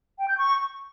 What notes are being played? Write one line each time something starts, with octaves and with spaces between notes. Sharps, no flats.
G5
G6
C#6